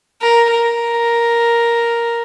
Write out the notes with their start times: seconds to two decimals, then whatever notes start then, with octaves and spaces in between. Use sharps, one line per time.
0.21 A#4
0.50 A#4